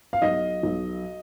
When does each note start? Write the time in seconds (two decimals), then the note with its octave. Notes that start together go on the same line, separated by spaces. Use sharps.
0.13 F5
0.22 B1 D#5
0.63 B1